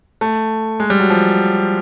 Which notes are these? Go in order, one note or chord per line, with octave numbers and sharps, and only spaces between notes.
A3
G#3
G3
F#3
F3